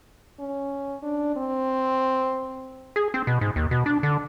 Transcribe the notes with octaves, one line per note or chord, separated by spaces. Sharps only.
C#4
D4
C4
G#4
C4
B2
G#2
D#2
B2
D4
D3